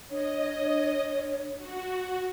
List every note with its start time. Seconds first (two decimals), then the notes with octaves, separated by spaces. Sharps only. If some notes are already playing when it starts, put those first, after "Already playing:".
0.10 D4 C#5 D#5
1.57 F#4